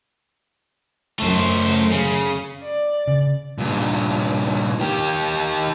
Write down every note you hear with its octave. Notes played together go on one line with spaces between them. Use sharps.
F#2 A3 C5
C#3
D5
C#3
G2 A#2
D#3 G4